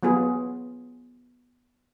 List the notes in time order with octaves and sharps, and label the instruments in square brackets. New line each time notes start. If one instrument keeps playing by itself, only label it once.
[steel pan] F#3 B3 F4 G#4